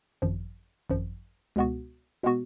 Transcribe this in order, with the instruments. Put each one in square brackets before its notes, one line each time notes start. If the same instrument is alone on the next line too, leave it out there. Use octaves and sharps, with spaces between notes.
[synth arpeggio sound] G#1 F#2 F3
G#1 F#2 F3
C#2 B2 G#3 B3 F#4
B2 G#3 B3 F#4